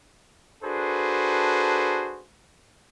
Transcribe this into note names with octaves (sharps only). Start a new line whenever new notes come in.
D4 F#4 G#4 A4 B4 C5